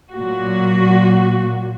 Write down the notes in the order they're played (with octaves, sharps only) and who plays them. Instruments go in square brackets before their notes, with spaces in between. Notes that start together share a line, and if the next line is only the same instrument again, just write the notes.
[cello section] A#2 F#3 F#4